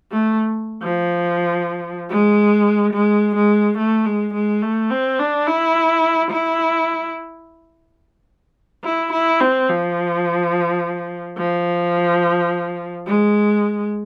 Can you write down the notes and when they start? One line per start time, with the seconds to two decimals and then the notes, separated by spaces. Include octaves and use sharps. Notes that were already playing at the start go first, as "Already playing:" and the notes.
0.12 A3
0.82 F3
2.09 G#3
2.93 G#3
3.35 G#3
3.78 A3
4.06 G#3
4.34 G#3
4.62 A3
4.90 C4
5.19 D4
5.47 E4
6.31 E4
8.84 E4
9.13 E4
9.41 C4
9.69 F3
11.37 F3
13.07 G#3